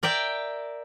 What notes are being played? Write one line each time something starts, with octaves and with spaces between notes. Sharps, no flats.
A#4 D5 E5 G5